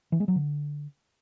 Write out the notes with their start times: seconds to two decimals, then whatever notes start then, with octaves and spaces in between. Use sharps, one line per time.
0.12 E3
0.20 G#3
0.28 F#3
0.36 D3